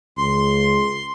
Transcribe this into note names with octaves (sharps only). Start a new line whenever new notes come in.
C#2 C6